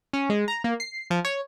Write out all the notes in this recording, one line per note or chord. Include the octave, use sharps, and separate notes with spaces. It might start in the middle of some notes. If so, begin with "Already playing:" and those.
C#4
G#3
A#5
A#3
C7
F3
C#5